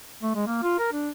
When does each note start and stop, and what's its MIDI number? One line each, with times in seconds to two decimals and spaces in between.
0.23 0.33 57
0.35 0.47 56
0.47 0.58 58
0.63 0.78 65
0.79 0.88 70
0.93 1.10 62